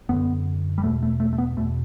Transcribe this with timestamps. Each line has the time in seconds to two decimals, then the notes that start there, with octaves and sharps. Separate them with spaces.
0.09 F#2 D3 B3
0.78 G3
0.83 E2 B2 A3
1.03 A3
1.20 A3
1.33 A3
1.38 B3
1.57 E2 B2 A3